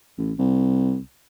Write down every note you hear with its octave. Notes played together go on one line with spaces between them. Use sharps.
A1
C2